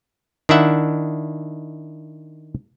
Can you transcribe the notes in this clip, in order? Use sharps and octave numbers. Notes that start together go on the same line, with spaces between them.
D#3 D4 E4 E5 F#5